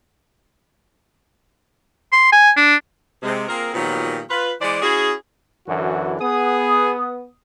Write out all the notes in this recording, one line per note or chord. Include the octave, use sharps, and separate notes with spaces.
C6
G#5
D4
C3 G#3
A#3 C4 F4 G#4 A#4
A#2 D#3 F3 F#3 B3 G4
F4 B4
E3 G#3 C5 D5
C#4 E4 F#4 G#4
F#2 D3 E3 F#4
B3 G#4 D#6